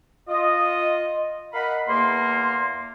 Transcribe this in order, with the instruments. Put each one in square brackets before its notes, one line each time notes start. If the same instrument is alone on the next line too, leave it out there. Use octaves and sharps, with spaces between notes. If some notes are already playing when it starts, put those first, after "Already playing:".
[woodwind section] F4 D#5
A#4 D#5 F5 F#5 B5
E2 A#3 C6